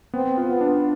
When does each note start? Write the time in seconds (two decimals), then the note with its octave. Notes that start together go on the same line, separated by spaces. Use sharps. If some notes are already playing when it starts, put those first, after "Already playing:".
0.14 B3 C4
0.37 F4
0.49 B3
0.61 D4